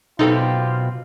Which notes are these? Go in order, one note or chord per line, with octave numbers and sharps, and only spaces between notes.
F#2 B2 C4 D#4 F4 G4 A4